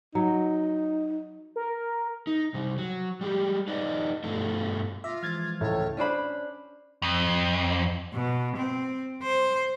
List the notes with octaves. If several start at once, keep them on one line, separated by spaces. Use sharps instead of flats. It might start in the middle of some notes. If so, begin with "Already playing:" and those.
F#3 D#4
A#4
D#4
C3 G3
F#3
G3 G#3 G4
D#4 B4 D5 D#5
G2 B2 D3 A3 F4
F4 E5 D6 A#6 B6
E3 F3 G#3 F6 G#6 A6
C#2 A2 A3 C#5
C#4 D4 C5 B5
F2
B2
C4
C5